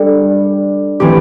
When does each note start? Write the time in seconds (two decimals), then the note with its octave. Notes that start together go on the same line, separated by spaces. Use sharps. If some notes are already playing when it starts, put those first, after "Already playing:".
Already playing: G3 D4 A4
1.00 E3 A3 C4 G4